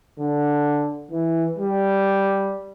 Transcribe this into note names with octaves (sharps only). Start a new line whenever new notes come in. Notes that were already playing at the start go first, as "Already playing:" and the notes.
D3
E3
G3